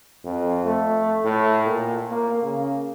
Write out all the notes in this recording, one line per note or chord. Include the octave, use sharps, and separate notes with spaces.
F2
A3
A2
A#2
A#3
C#3